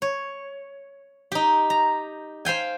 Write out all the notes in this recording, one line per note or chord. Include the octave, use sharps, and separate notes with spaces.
C#5
D#4 G4
A#5
C5 F5 G5 G#5